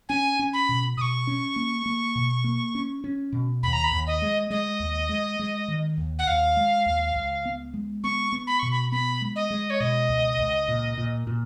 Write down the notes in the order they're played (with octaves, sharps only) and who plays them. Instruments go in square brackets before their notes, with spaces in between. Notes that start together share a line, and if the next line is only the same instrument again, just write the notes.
[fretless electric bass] C#4 [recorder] G#5
[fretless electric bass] C#4
[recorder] B5
[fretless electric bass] B2
[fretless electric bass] B2 [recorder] D#6
[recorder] C#6
[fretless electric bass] C#4
A#3
A#3
B2
A#3
C#4
C#4
B2
[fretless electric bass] D#2 [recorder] B5
[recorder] A#5
B5
[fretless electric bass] D#2
[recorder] D#5
[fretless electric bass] G#3
[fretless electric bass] G#3 [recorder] D#5
[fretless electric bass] D#2
G#3
G#3
D#3
D#2
[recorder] F#5
[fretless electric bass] D#2 [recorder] F5
[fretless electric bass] G#3
D#2
C#2
B3
G#3
[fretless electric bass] B3 [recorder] C#6
[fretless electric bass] B3
[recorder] B5
[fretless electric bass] B2 [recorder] C#6
[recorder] B5
[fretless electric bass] B3 [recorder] B5
[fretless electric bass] G#3
[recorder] D#5
[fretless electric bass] G#3
[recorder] C#5
[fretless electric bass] B2 [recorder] D#5
[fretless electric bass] C#2
C#2
A#2
A#2
A#2